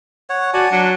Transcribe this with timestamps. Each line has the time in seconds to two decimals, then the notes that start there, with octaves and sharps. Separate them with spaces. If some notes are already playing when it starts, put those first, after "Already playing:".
0.30 C#5 F#5
0.54 F#4 D5 G#5 A5
0.72 F#3 D4